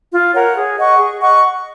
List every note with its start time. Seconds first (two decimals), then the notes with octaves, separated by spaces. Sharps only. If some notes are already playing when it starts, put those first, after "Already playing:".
0.12 F4
0.34 A#4 C#5 F#5
0.55 G#4
0.77 D#5 F#5 C#6
0.98 G#4
1.20 D#5 F#5 C#6